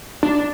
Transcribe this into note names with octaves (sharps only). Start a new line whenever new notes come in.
D4